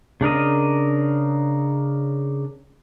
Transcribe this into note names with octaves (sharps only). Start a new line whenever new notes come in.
C#3 D4 A#4 D#5